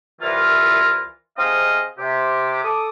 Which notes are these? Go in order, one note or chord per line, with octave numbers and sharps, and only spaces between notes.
C2 E3 F4 A#4
C3 C4 D#4 G#4 D#5 F5
C3 G4
A4 D6 D#6